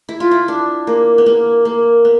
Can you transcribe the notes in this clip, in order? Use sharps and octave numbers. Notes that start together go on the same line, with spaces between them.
E4
F4
E4
D4
A#3
B3
A#3
A#3
B3